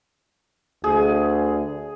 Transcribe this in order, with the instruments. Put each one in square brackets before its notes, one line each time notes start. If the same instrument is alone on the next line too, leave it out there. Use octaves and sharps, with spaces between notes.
[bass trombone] D2 [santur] G#4